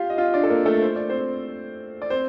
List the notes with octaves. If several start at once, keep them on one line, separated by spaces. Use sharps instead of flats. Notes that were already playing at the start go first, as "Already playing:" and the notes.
Already playing: F4 G4 F5
D#5
F4 F5
D4 D5
A4
A#3 A#4
A3 A4
C5
D5
C4 C5
D5
C4 C5